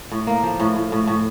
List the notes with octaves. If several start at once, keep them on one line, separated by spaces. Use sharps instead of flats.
A2
A#3
F3
A2
A2
A2
A2